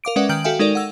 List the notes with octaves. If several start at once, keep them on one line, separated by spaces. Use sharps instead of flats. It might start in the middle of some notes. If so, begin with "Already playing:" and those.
A#4 F5 D6 D7
G#3 C#4 B4 D5 E5 F#5
D#3 G5 F6 G6 D7 F#7
F#4 A4 E5 F5 G5 G#5
G#3 D#4 A4 A#4 D5
F#5 E6